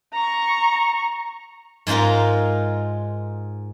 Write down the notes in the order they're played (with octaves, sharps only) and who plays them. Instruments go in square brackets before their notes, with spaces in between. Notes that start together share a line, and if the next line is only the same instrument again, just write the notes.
[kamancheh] A#5 C#6
[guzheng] G#2 G#3 D#4 F4 A#4